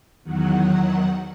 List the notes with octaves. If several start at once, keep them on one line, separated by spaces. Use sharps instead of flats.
E2 D#3 F#3 F#5